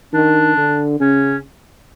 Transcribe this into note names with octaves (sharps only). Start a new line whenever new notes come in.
D#3 D4
D3
C#3 C#4